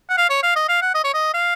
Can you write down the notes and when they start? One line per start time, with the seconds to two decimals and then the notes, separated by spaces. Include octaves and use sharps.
0.10 F#5
0.17 F5
0.30 C#5
0.43 F5
0.56 D#5
0.69 F5
0.82 F#5
0.95 D#5
1.04 C#5
1.14 D#5
1.34 F5